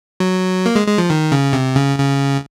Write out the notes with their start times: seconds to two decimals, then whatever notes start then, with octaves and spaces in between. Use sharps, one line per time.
0.20 F#3
0.66 A#3
0.76 G#3
0.87 G#3
0.98 F3
1.10 D#3
1.32 C#3
1.53 C3
1.76 C#3
1.98 C#3